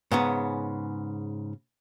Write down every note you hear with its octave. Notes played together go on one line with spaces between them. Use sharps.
G#2 C#3 B3